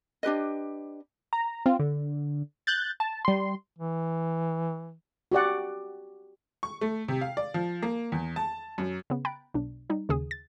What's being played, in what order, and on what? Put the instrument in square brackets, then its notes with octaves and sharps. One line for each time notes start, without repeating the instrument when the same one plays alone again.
[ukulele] D4 G4 B4 D#5
[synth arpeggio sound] A#5
C4 F4
D3
F#6 G6 A6
A5
G3 C6
[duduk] E3
[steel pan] F#4 G4 D5 F#5
[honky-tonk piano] C#6
A3
C3
F5
D5
F3
A#3
E2
A5
F#2
[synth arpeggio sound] C#3 B3
G5 A#5 B5 F#6 A6 D7
B1 D4
G3 D#4
D#2 C#3 G#4 D#6
A6